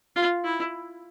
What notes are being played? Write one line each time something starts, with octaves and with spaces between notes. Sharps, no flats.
F4
E4